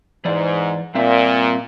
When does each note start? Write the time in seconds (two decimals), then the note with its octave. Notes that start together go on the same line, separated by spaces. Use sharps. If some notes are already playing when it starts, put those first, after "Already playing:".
0.25 G#2 E3 D5
0.95 G2 A#2 C4 E5